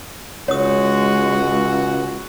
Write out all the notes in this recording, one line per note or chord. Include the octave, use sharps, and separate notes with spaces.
C#2 G#3 F#4 C#5 D#6